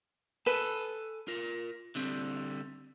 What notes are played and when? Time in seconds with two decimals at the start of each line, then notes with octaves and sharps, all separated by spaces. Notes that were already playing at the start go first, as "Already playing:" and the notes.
0.46 A4 B4 G#5 A5
1.28 F4 A#4
1.95 D3 G3 C4